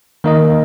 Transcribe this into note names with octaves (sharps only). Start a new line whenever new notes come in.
D#3 A#3 D#4 A#4 D#5